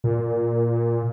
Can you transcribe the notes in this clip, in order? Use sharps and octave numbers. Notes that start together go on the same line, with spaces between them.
A#2